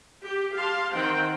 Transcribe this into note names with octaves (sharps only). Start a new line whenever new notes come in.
G4
F5 A5 C6
D#3 C4 F#5 G5